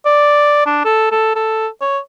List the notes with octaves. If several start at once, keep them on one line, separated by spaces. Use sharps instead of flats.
D5
D4
A4
A4
A4
C#5